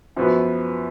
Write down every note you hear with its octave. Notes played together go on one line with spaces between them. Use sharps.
F#2 F3 B3 F#4 B4